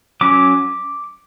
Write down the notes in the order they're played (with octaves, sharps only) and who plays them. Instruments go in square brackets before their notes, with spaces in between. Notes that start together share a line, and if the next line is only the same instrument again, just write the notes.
[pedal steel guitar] F#3 C#4 D6